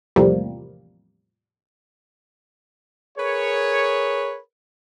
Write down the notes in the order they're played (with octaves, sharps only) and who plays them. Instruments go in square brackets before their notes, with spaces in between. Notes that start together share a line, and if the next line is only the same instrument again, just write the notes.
[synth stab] E2 A2 C3 F3 G3 A#3
[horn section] G#4 A#4 B4 C#5